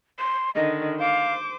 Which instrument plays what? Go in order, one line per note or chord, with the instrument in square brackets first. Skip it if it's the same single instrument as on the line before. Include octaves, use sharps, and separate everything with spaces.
[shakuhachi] C6
[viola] D3 D#3 [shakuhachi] D#5
[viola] C5 D6 [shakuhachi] F5